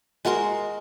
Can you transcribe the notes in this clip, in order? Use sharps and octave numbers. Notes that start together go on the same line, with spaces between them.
G#3 F#4 A#4 C6